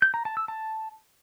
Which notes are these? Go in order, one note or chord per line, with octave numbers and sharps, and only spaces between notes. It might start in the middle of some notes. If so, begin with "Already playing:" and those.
G6
A#5
A5
E6
A5